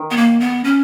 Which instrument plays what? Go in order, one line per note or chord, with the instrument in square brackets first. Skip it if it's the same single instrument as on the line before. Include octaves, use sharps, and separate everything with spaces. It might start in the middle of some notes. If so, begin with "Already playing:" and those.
Already playing: [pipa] D#3
[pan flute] B3
A#3
B3
C#4